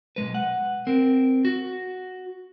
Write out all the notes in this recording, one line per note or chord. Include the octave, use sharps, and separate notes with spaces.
B1 F#2 G#3 B4
F#5
C4 A#4
F#4